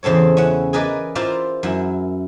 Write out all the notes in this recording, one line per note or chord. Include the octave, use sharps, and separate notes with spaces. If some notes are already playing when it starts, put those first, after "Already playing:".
E2 C#3 C4 A4 C#5
C#4 E4 F#5
G#4 A#4 B4 D5 D#5
E4 F4 A#4 C5 D5 E5
F#2 E4